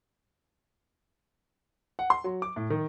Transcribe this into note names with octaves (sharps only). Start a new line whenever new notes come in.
F#5
C6
F#3
D6
A2
D#3